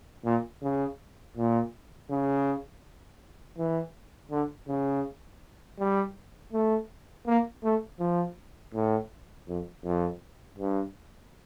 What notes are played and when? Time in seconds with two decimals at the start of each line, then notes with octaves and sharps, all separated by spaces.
0.25 A#2
0.62 C#3
1.37 A#2
2.10 C#3
3.58 E3
4.31 D3
4.68 C#3
5.79 G3
6.53 A3
7.26 A#3
7.64 A3
7.99 F3
8.74 A2
9.48 F2
9.84 F2
10.58 G2